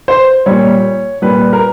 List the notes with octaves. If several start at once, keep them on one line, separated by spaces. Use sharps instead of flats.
C5
A#2 G3 C#5
A#2 G3 B4
A#4